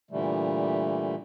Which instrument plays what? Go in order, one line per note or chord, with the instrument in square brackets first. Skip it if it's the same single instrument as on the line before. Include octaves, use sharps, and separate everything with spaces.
[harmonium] A#2 D3 E3 G3 A3